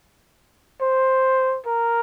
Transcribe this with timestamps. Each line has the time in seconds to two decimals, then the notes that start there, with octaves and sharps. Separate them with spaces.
0.81 C5
1.66 A#4